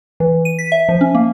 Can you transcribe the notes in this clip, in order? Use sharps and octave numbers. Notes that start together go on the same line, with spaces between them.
E3
D#7
B6
E5
F3
C#4
A#3